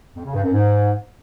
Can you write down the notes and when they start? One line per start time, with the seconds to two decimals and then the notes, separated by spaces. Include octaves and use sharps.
0.16 F2
0.25 C#3
0.35 G2
0.44 F#2
0.53 G#2